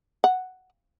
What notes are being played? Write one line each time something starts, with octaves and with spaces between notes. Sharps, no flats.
F#5